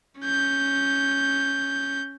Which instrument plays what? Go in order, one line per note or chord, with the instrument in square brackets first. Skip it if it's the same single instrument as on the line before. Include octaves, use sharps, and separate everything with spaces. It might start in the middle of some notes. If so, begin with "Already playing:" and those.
[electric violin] C#4 G6